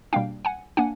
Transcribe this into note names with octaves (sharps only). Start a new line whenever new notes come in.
B2 G3 A#3 D4 F5 G5
F#5 G#5
A#3 D4 F#5 G#5